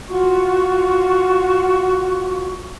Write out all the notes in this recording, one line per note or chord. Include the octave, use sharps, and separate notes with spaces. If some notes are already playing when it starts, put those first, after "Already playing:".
F4 F#4 C#6